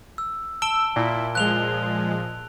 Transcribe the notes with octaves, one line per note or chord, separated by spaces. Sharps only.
E6
A5 E6 D7 G7
A#2 E4
F3 G#3 F#6 F7 G7